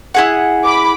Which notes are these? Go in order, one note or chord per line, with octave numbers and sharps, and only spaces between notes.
E4 G#4 F#5
B5 D6